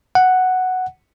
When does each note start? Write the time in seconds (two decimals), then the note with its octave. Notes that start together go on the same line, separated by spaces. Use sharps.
0.15 F#5